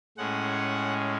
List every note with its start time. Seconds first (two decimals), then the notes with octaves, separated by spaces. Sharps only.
0.18 A2 G#3 C#4 F#5